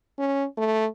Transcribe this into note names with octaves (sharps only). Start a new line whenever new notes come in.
C#4
A3